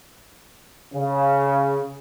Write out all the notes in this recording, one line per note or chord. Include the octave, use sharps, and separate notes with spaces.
C#3